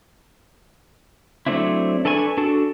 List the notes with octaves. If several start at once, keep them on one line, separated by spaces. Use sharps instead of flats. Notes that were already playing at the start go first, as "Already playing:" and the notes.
F#3 A3 C4 D4 E4
D4 A4 B4 G#5 C#6
D4 F#4 A4